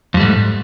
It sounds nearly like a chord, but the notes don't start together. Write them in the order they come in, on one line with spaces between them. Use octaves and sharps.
F2 G3 A3 G#2